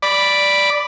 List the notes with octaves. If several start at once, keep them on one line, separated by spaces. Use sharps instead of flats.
D5 B5